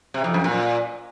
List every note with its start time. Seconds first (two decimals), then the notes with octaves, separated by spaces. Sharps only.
0.14 C3
0.24 F2
0.34 F#2
0.44 A#2